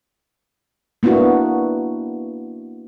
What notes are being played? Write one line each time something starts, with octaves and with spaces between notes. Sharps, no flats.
A#3 B3 D4 E4 F#4